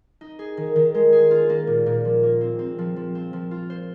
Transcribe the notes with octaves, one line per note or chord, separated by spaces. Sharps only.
D#4
G#4
D#3
D#3
G#3
G#4
F4
A#3
A#2
A#2
F3
A#3
C4
C4
F3
F3
C4
F3
F4
C5